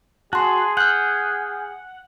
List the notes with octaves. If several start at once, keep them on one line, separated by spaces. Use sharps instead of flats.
F#4 G#4 A5 C6
F#5 F6 G6